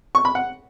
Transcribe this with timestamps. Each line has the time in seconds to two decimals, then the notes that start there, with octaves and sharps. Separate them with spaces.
0.15 C#6
0.25 B5
0.35 F#5